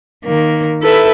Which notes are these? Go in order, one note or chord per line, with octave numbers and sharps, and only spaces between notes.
D#3 A#3
E4 A4 B4 E5